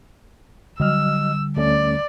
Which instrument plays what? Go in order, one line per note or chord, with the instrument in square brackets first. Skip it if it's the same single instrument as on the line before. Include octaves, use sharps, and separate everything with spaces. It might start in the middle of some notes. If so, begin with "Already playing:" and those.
[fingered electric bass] D3 G3 [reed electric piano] F#3 D#5 F6 [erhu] E6
[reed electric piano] D2 A3 C#4 [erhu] D5